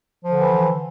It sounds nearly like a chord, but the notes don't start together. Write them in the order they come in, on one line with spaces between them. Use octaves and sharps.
F3 D3 E3